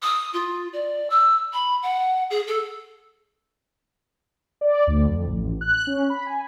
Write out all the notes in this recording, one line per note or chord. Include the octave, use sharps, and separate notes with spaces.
D#6
F4
D5
E6
B5
F#5
G#4
A4
D5
D2
F2
A1
F#6
C#4
B5
G#5